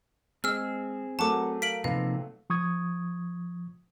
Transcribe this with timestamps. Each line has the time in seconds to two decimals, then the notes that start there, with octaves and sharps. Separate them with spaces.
0.44 G#3 C4 G#4 D#5 E6 F6
1.19 F#3 A3 A#4 F#5 A5 C#6 D6
1.62 A#4 F5 B6 D7 F#7
1.84 C3 F3 A#3 D#4 B4 F5
2.50 F3 C#6 D#6 G#6